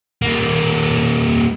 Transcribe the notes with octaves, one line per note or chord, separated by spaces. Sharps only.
G3 A#3